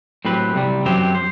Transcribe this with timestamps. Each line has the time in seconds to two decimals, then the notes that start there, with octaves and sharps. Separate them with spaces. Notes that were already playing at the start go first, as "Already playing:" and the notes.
0.25 A2 F#3 C4 G4 B4
0.55 C2 C3 G3
0.85 F#2 F#3 C4 G4 C5
1.15 C5